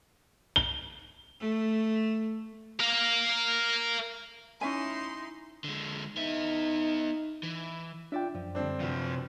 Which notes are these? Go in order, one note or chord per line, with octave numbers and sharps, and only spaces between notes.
G7
A3
A#4 F5
C#4 D#4 E4 E5 G#5 C6
D3 G#3
B3 D#4 E5
E3
D4 F4 D5 E5 G5
F#2 F3
G2 D3 C4 D4
C3 F3 E4 F#4 B4